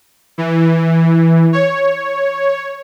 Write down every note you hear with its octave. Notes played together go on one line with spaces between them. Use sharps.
E3
C#5